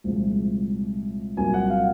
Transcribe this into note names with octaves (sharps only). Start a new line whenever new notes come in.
C2 A#2 F3 G#3
C2 A#2 F#3 A#3 G#5
F#5
F5